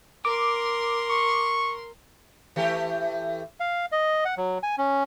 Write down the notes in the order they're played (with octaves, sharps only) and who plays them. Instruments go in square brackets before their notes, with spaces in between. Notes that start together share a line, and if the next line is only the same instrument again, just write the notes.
[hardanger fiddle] A#4 C6 [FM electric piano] D6
[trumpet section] C#6
[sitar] E3 A3 G4
[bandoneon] F5
D#5
F#5
F#3
G#5
C#4